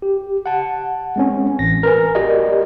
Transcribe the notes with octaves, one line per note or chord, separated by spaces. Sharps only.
G4
F#5 A5
G#3 C4 C#4
A1 A#6
A#4 B4 G#5
F#4 G4 A#4 D5 D#5